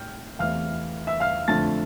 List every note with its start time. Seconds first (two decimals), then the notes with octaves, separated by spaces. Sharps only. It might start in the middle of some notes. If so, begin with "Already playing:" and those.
Already playing: A2 G5 F6 G6
0.39 E2 C3 E3 A3 F5 F6
1.07 E5 E6
1.20 F5 F6
1.48 F2 D3 F3 A3 A5 A6